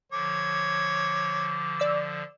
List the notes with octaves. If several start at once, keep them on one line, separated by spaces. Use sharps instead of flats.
D3 F3 C#5 D6
D5 E6